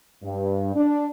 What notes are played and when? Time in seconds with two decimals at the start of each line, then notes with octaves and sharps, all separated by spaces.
0.23 G2
0.75 D4